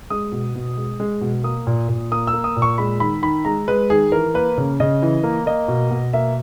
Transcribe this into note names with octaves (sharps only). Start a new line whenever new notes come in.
G#3 D#6
B2
B2
G#3
G#3
B2
A#3 D#6
A#2
A#2
A#3 D#6
E6
A#3
D#6
A#2
C#6
G#3 B5
D#3 B5
D#3 B5
G#3 A#5
G#3 B4
D#3 G#4
E3 A#4
A#3 B4
C#3
C#3 D#5
E3
A#3
A#3 D#5
B2
B2
A#3 E5